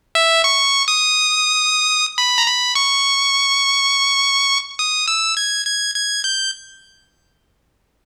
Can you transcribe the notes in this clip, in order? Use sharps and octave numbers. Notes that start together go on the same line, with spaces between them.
E5
C#6
D#6
B5
A#5
B5
C#6
D#6
E6
G#6
G#6
G#6
G6